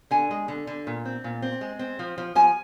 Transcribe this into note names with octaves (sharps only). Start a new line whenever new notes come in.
D3 G#5
G#3
D3
D3
A#2
C4
A#2
C4
G#3
C4
F3
F3
F3 G#5